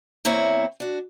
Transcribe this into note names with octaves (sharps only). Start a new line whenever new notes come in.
E2 A#3 C4 E4 C#5
D4 F#4